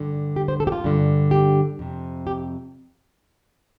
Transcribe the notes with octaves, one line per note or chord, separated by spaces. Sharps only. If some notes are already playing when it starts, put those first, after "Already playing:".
Already playing: G2 D3
G4
C5
A4
G4
F4
G2 D3
G4
F2 C3
G4